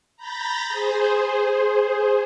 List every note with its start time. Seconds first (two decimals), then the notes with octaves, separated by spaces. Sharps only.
0.17 A#5 B5 G6 A6 A#6
0.69 G#4 C5